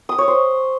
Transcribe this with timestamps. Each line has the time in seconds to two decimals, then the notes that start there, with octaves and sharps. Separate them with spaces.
0.09 D#6
0.18 C#5
0.28 C5